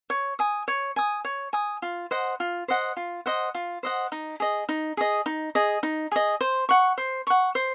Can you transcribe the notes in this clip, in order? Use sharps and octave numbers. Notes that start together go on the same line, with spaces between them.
C#5
G#5 D#6
C#5
G#5 D#6
C#5
G#5 D#6
F4
C5 D#5 F#5
F4
C5 D#5 F#5
F4
C5 D#5 F#5
F4
C5 D#5 F#5
D#4
G#4 D#5
D#4
G#4 D#5
D#4
G#4 D#5
D#4
G#4 D#5
C5
F#5 C#6
C5
F#5 C#6
C5